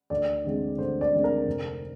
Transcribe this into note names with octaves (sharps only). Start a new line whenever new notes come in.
D2 D5
D3 G#3 C4
D2 C5
D5
D3 G#3 C4
A#4
F1